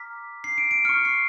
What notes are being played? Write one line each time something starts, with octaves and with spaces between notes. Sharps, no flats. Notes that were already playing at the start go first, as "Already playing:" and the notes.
Already playing: A#5 D6 F6 B6
C7
D7
D7
C#6 F6 C#7
C7